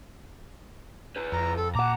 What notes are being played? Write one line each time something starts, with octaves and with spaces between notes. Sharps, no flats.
G#4 B4
F2 A#5
A4
A#2 F#5 A5 A#5 D6